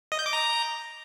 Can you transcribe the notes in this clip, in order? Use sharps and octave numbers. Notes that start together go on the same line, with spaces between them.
D#5
G6
D6
A#5